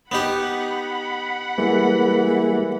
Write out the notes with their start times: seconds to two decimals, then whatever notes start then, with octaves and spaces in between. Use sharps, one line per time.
0.12 B3 D#4 G4 F#5 B5
1.58 E3 G3 G#3 A#3